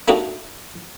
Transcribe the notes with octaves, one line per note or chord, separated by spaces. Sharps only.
A3 A#3 D4 D#4 F#4 G4